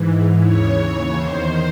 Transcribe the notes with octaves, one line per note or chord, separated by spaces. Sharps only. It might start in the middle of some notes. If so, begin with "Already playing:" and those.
Already playing: G#2 E3
D#2 C#3 E3 C#5
C#5
E2 D#3 C5